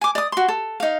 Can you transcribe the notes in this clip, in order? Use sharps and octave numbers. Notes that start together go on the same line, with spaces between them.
G#5 D6
D5 D#6
F#4 C6
A4
D#4 F5